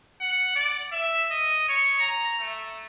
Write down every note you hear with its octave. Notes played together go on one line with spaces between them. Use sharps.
F#5
D5
E5
D#5
C#5
A#5
A3